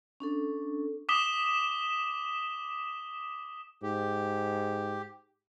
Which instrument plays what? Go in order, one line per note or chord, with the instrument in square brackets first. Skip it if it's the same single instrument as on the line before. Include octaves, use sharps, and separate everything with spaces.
[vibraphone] C#4 D4 A4
[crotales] D6 D#6 B6 E7 G7
[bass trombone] G#2 [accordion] G4